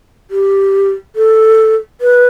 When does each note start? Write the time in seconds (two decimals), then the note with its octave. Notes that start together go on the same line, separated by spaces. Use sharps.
0.31 G4
1.16 A4
2.01 B4